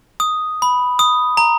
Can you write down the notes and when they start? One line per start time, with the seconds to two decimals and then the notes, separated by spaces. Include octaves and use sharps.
0.20 D#6
0.62 B5
0.99 D#6
1.37 A#5